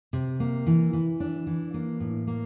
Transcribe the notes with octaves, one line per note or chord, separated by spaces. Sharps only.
C3
A#3
E3
E3
D4
E3
A#3
A2
A#3